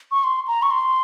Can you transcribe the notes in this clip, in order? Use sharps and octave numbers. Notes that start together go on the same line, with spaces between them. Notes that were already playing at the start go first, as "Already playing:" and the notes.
C#6
C6
A#5
C#6
C6